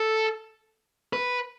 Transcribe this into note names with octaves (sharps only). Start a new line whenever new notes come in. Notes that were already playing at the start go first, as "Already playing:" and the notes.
Already playing: A4
B4